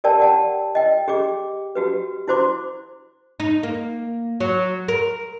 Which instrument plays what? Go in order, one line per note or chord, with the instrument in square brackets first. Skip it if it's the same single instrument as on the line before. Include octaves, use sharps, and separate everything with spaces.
[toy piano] G4 A#4 C#5 D5 G5 A5
G4 F#5 A5
D#5 G5
G4 G#4 D6
F#4 G4 B4
E4 F#4 C5 C6 D6
[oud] D#4
A#3
F#3
A#4